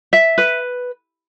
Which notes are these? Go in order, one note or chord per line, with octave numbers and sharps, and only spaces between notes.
E5
B4